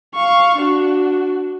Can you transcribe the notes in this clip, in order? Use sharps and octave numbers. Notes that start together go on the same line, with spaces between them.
F5 C#6
D4 F#4